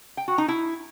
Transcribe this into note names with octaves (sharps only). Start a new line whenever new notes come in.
G5
F#4
D#4
E4